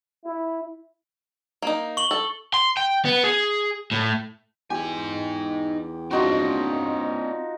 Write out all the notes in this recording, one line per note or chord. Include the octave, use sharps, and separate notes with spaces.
E4
A#3 D#4
C#6 F#7 G7
A4
C6
G5
B3
G#4
A2
E2 D#4 G4 G#5
F3 C4 D4 D#4 F#4